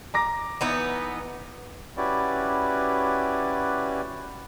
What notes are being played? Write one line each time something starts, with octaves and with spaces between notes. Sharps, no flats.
A#5 D6 A#6
E3 B3 D#4
C#4 E4 F#4 G4 B4 D5